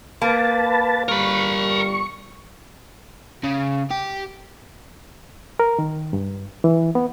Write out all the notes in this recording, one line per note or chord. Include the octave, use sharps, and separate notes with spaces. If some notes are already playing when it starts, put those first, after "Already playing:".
A#3 B4 A5
G1 G3 A#4 B5 C#6
C#3
G4
A#4
D#3
G2
E3
B3